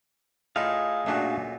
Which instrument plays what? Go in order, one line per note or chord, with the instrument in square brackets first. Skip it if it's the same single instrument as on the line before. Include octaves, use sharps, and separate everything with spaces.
[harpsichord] A2 D#4 [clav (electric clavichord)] F4 [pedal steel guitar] G#4 F5
[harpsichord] F#2 A#2 [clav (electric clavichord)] A3 D4 F#4